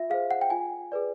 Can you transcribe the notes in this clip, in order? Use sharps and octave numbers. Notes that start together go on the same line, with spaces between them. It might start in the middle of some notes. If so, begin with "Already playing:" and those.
Already playing: F4 E5
G#4 C5 F5
F#5
G5
F4 G#5
G#4 B4 D5